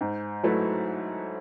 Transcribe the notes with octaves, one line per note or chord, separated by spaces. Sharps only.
G#2
F#3 A3 E4 B4